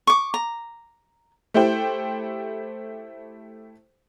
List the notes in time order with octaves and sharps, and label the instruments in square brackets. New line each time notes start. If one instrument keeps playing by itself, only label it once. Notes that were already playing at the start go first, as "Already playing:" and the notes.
[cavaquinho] C#6 D6
A#5
[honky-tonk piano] A3 E4 G4 C5 G5